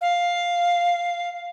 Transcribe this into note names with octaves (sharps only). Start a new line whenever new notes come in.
F5